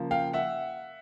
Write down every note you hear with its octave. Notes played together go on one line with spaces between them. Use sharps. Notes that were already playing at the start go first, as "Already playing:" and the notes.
Already playing: C#3 F3 A#3
F5 G5
E5 F#5